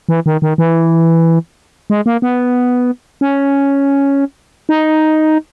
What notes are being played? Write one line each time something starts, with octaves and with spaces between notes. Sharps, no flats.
E3
D#3
D#3
E3
G#3
A#3
B3
C#4
D#4